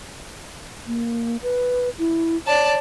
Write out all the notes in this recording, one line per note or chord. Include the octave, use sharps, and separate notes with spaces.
A#3
B4
E4
C#5 D5 A5